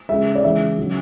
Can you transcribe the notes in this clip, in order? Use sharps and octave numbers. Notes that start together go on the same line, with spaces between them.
C#3 G#3 E5
D5
C#3 E3 G#3 E5
C#3 F#3